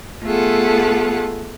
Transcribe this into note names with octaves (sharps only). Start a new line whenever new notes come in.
A3 B3 F4 G#4 A4 F#5